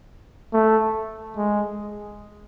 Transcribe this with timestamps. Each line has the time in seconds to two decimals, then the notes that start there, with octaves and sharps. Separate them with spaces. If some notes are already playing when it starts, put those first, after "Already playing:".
0.53 A3
1.37 G#3